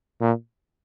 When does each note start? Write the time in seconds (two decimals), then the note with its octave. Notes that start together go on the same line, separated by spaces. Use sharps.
0.21 A#2